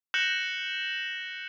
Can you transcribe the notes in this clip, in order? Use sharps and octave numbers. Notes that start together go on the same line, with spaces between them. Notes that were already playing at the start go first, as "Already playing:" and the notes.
F#6 G6 A#6 C#7 E7 F#7